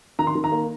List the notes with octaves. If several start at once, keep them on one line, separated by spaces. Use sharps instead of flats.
D#3 A#5
C6
D#3
A#5
A#3